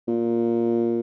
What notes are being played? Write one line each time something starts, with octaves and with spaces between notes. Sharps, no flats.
A#2